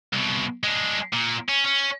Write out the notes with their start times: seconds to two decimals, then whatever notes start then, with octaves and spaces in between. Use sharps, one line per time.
0.13 C2 B2
0.64 G#3 D4
1.13 A#2
1.48 C#4
1.65 C#4